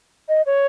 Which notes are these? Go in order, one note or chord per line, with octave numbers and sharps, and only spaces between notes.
D#5
C#5